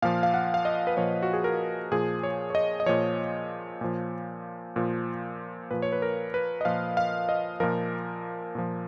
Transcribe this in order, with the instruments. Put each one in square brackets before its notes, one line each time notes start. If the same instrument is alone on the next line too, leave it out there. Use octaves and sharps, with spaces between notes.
[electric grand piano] A#2 F3 F5
F5
F#5
F5
D#5
B4
A#2 F3 C#5
F#4
G#4
A#4
A#2 F3 G#4
C#5
C#5
D#5
D#5
A#2 F3 C#5
A#2 F3
A#2 F3
A#2 F3 B4
C#5
B4
A#4
B4
D#5
A#2 F3 F5
F5
D#5
A#2 F3 A#4
A#2 F3